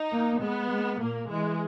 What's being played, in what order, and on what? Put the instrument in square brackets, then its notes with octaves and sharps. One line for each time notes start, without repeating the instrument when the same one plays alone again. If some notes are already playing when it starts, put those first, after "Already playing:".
Already playing: [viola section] D#4
[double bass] A#3
[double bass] G#3 [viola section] B3
[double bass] G#3
[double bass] A#2 [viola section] A#3
[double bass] E3 [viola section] G#3